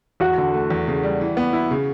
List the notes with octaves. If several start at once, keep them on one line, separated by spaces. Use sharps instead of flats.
E2 F#4
D3
A3
E2
C#3
G3
E3
B3
E4
C#3